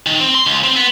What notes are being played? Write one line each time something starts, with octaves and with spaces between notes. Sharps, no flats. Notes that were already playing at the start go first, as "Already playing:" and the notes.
D#3
C4
C6
C#2
C4
B3